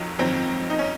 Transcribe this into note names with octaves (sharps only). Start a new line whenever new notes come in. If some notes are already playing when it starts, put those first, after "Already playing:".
Already playing: F2 D#3 F#3
F2 D#3 F#3 C4
D#4
C#4